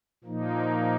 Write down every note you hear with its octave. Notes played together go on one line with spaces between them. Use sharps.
A#2 F3 A#3 D#4